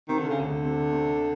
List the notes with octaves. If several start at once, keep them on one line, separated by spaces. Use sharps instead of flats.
C3 D#3
D3
C#3
D2 D3
C3
C3